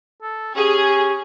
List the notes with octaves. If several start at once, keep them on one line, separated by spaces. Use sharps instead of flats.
A4
C#4 G4 G#4